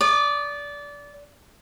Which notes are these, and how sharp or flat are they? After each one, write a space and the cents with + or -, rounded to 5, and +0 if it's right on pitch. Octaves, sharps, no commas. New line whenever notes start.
D5 -20 D#6 -45